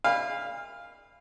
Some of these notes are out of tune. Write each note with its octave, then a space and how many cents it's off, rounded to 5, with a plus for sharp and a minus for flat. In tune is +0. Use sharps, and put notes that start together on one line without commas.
F5 +0 G#5 -40 B5 +0